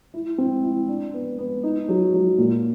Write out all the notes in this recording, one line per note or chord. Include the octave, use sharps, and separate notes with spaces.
E4
C4
E4
D4
B3
B3
D#4
F#3
F#3
A#2